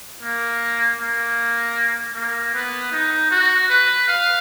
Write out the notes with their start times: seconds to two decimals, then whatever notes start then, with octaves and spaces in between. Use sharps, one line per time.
0.22 A#3
0.99 A#3
2.14 A#3
2.54 B3
2.92 D#4
3.31 F#4
3.69 B4
4.08 F5